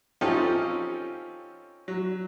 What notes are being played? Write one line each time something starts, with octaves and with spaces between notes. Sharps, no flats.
C4 C#4 D#4 F4 G4 A4
F#3